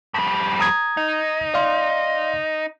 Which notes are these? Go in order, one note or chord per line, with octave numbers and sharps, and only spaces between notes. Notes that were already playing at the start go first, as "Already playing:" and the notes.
F2 G3
A#5 D#6 G#6
D#4
D5 F5 C6